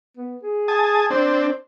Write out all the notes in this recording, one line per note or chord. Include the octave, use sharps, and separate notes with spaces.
B3
G#4
G#5 A5 D#6
C4 D4 C5